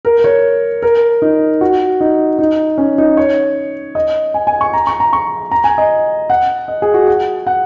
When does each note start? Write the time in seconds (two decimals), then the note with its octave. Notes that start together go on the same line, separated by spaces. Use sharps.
0.05 A#4
0.24 C#5
0.82 A#4
1.22 D#4
1.61 F#4
2.01 D#4
2.39 D#4
2.78 C#4
2.98 D#4
3.17 C#5
3.95 D#5
4.34 G#5
4.47 G#5
4.61 C#6
4.73 A#5
4.87 C#6
5.00 A#5
5.13 C#6
5.51 A#5
5.64 G#5
5.78 D#5
6.30 F#5
6.68 D#5
6.82 G#4
6.94 F#4
7.08 F#5
7.47 F#5